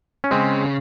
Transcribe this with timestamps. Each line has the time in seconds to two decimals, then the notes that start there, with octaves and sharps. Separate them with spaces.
0.24 C#4
0.31 C#3 G#3 C4